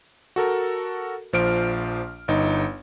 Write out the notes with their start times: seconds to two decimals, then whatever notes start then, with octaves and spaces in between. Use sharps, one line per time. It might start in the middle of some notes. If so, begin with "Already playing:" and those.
0.36 F#4 A4 A#4
1.33 A#1 F3 C5 F6 D7
2.28 G1 D#4